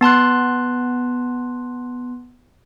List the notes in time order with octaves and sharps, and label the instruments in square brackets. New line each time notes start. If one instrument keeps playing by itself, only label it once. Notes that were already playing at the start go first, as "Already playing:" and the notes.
[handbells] B3 A5 C6 F#6